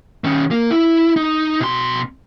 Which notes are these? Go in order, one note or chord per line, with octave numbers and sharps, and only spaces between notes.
D#3 C#4
A#3
E4
D#4
B2 C6